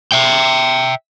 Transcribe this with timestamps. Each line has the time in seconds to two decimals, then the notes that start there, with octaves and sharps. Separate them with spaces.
0.12 E5 G5